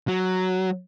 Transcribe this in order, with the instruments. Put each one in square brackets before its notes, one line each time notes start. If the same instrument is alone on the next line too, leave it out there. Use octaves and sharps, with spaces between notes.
[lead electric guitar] F#3